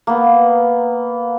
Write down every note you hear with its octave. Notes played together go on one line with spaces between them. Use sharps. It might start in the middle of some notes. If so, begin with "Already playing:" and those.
A#3 B3